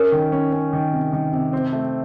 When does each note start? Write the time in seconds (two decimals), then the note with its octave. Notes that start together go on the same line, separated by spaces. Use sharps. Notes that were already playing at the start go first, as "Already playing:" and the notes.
Already playing: C#4 A#4
0.12 D#3
0.32 C#4
0.52 C#4
0.73 D#3
0.93 C3
1.13 D#3
1.33 C3
1.53 C4
1.73 A3